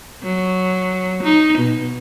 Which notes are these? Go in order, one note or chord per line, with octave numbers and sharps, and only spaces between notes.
F#3
D#4
B2